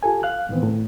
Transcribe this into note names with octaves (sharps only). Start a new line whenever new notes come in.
F4 G4 A4 G#5
F5 F6 F#6
A2 D#3 E3 B3 C4
A2